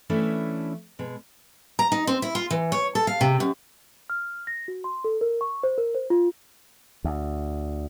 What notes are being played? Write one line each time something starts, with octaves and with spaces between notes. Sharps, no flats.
E3 A3 C#4 D4 E4
B2 G#3
A#5
D#4
C4
E4
F4
E3
C#5
A4
F5
C3
F#2
F6
A#6
F#4
C6
A4
A#4
C#6
C5
A#4
C5
F4
D2